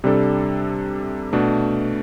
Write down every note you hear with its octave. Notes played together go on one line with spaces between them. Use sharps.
C3 G3 D4 A4
B2 A3 D4